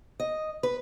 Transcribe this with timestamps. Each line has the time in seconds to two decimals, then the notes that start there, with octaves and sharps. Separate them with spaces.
0.20 D#5
0.63 B4